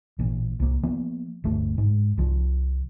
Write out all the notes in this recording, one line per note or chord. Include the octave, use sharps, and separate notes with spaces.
A1 A#2
C2 A#3
F3 A#3 B3
D1 G1 A3
G#2 G#3
C2 F3